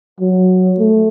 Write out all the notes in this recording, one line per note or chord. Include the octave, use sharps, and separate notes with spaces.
F#3
A3